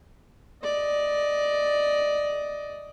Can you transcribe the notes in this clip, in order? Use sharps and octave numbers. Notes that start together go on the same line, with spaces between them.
D5 D#5